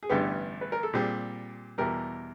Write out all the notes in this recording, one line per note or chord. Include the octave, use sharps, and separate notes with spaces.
G#4
A1 G2 D3 G3 B3 G4
B4
A#4
A4
A#2 G3 C4 G#4
E2 B2 G3 A#4